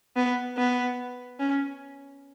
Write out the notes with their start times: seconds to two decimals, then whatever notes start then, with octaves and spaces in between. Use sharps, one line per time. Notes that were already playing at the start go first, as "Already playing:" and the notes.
0.16 B3
0.58 B3
1.40 C#4